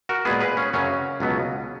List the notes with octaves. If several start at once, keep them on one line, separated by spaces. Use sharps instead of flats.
F#4 A#4
A#2 G#3 B3 G#4 B4
G#4 B4
C#4
F#2 C#3 F#3 C#4
C#2 B2 F#3 B3